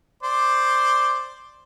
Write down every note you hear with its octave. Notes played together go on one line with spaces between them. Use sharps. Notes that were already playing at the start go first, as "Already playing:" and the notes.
C5 D5